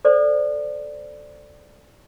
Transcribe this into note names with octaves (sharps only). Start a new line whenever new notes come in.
A4 C5 D5